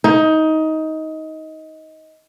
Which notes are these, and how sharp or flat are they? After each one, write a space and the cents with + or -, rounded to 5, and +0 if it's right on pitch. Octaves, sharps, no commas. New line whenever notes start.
D#4 +20